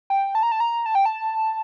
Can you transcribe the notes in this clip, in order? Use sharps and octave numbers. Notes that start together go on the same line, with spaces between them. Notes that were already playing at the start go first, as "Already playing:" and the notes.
G5
A5
A#5
A5
A#5
A5
G5
A5